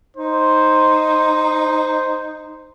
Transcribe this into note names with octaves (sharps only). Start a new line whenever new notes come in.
D#4 C5